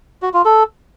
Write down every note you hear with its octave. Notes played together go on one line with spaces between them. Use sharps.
F#4
F4
A4